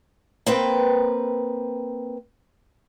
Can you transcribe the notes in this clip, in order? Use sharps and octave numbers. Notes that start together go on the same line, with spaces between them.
A#3 C4 B4 G5